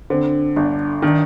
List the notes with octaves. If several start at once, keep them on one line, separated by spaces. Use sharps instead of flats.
D3 C4
G1 D4
D#3 D4